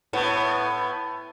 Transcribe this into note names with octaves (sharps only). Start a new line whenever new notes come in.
A2 B3